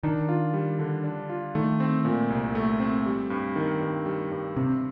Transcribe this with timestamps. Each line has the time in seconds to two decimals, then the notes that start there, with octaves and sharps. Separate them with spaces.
0.03 D#3 D4
0.29 F4
0.54 G3
0.79 D3
1.04 D4
1.29 F4
1.55 D#3 A3
1.80 C4
2.05 A#2
2.30 C2
2.55 A3
2.80 C4
3.06 G3
3.30 G2
3.56 D#3
3.81 G2
4.06 G3
4.31 G2
4.57 C3 C4